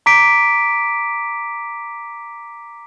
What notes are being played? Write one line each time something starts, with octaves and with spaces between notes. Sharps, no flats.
A#5 D6 B6 D7